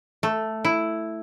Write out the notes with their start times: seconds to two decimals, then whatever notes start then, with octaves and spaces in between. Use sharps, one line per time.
0.23 A3
0.65 E4